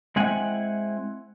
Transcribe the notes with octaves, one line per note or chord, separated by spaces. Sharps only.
G#3 C4 E4 F#5 G#5